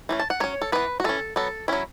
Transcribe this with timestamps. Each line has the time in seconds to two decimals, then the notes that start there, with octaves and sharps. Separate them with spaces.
0.09 E3 A3 C#4
0.19 A5
0.30 F#5
0.40 F#3 C#4 C#5
0.62 A4
0.72 E3 B3 B4
1.00 F#4
1.04 E3 C#4 A4
1.36 F#3 B3 A4
1.68 F#3 C#4 E4